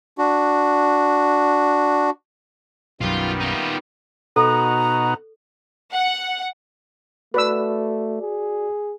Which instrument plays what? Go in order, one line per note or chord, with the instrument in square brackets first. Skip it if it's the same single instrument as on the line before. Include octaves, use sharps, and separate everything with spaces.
[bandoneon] D4 F#4
[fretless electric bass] B1 F#2 [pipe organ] D#3 G3 B3 [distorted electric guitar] F4
[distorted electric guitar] D#4 F4
[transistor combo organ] B2 D#4 F#4 [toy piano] A4 [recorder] A#5
[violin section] F#5
[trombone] A3 [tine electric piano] F#4 D5 [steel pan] B4 E6
[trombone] G#4